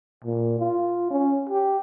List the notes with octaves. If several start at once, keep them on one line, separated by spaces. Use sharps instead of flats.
A#2
F4
C#4
G4